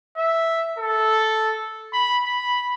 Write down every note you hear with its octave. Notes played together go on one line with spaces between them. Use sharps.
E5
A4
B5
B5